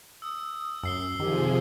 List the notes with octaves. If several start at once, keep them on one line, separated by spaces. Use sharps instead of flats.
D#6 E6
F#2 E6 C7 G7
C3 D#3 F3 G4 G#4